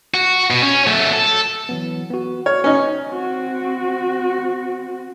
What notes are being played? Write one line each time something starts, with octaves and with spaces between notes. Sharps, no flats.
F#4
B2
C#4
F#3 A3
A4
E3 F#3 B3
B3 F#4
C#5 F6
C#4 D#4
C4 F#4